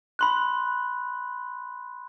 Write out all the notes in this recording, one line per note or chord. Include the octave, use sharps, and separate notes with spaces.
B5 C6 F#6